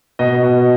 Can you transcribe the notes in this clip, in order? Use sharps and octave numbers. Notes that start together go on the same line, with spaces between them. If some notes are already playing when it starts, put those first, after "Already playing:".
B2 D#5
B2